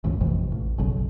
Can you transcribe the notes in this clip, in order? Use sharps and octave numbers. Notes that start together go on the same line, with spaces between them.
G#1 C#2 F#2
A1 F2 C3 E3
A1
F#1 B1 C#3